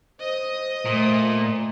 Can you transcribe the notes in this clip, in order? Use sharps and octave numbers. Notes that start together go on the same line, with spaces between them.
C5 D#5 D#6
A#2 A3